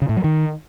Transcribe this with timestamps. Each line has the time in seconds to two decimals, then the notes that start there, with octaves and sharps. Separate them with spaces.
0.02 C#3
0.09 A2
0.17 F#3
0.24 D#3